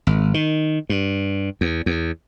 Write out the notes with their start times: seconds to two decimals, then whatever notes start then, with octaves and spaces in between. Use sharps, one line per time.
0.07 G#1
0.34 D#3
0.89 G2
1.61 E2
1.86 E2